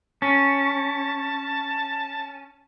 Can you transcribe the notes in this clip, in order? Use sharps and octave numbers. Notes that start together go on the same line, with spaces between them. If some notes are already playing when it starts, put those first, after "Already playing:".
C#4 A5